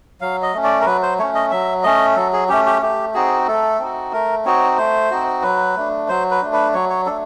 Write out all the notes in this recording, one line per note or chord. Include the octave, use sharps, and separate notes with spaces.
F#3 F5
D#5
A3 C#4
D5
A#4
F#3 B4
C5
A3 C#4 C#5
D#5
F#3 E5
A3 C#4 D#5
F#3 A4
G#4
A3 C#4 G4
G4
A3 G4
C4 D#4 F#4 G#4
A3 A4
C4 D#4 F#4
A3 A#4
C4 D#4 F#4 C#5
A3 C5
C4 D#4 F#4
F#3 B4
A3 D4
F#3 C5
B4
A3 D4
B4
F#3 C#5
C#5
A3 D4 A4